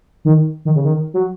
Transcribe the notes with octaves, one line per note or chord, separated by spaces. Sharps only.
D#3
D#3
C#3
D#3
F#3